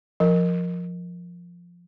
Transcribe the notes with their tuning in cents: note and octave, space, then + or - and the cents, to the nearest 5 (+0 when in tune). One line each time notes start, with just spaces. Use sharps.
F3 +0 A#4 +0